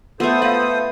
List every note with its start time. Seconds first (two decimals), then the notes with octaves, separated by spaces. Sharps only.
0.20 A3 B3 F4 A4 C5 D#6
0.42 B4 E5 F5